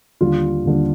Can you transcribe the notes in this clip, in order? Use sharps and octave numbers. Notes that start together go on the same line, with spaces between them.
D#2 D3 G3 F4
D#2 D3 G3